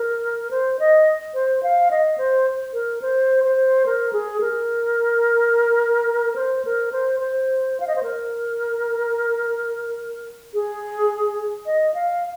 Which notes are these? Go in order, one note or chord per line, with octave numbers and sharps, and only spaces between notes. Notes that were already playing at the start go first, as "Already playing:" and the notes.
Already playing: A#4
C5
D#5
C5
F5
D#5
C5
A#4
C5
C5
A#4
G#4
A#4
C5
A#4
C5
C5
F5
D#5
C5
A#4
G#4
D#5
F5